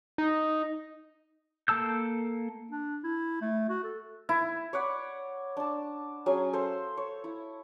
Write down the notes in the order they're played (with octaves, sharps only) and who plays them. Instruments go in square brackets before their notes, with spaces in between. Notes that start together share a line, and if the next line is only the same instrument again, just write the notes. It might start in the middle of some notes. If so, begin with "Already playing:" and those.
[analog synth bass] D#4
[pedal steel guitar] A#3 A4 A5 E6 G6
[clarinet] D4
E4
A3
F#4
A4
[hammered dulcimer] E4
[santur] C#5 D5 F#5 B5
D4 A5
F#3 C#4 G#4 G#5
A4 C5 F5
C#5
E4